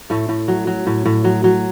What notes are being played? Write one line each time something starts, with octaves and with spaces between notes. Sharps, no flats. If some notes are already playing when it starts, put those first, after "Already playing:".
A2 A3
A2
F#3
F#3
A2
A2
F#3
F#3